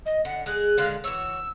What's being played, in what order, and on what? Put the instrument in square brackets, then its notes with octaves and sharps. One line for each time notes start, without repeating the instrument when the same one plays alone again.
[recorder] D#5
[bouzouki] D3 [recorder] F#5
[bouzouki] G#3 G#4 [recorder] F#6
[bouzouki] D3 G#3 F5
[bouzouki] E3 F#4 C#5 [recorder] E6